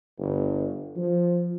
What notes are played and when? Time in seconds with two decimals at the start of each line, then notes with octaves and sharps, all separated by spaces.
0.18 G1
0.97 F3